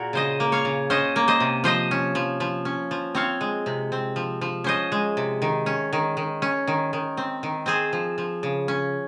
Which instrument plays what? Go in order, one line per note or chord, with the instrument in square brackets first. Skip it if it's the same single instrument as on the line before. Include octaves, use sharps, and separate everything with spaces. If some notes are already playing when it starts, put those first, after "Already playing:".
Already playing: [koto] A#2 F#4 G#4 A#4
C#3 C5 D#5
A#3
C#5 F5
C#3
C#4 C5 D#5
A#3
C5 D#5
C3
F3 C5 D#5
C#4
F3
F3
C#4
F3
C4 C#5 F5
G#3
C3
C4
F3
F3
C#4 C5 D#5
G#3
C3
D#3
C#4
D#3
D#3
C#4
D#3
D#3
C4
D#3
C4 G#4 C5
F3
F3
C#3
C#4